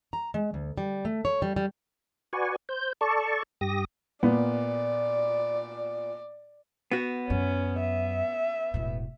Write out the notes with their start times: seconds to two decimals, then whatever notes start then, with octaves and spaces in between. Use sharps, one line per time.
0.13 A#5
0.34 G#3
0.54 D2
0.78 G3
1.05 A3
1.25 C#5
1.42 G3
1.56 G3
2.33 F#4 B4 D5 G#5 C#6
2.69 C5 G6
3.01 A4 D5 A5 C#6
3.61 G2 G4 D#6 A#6
4.23 A#2 B3 D5
6.91 B3 F#4
7.30 F#2 C#4
7.80 E5
8.74 E1 A2